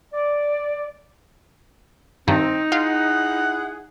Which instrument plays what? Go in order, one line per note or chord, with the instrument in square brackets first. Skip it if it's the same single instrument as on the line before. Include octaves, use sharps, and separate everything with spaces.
[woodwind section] D5
[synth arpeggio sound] G2 D#3 [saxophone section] C4 [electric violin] D#4
[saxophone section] E4 G#4 F#5 [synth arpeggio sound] F4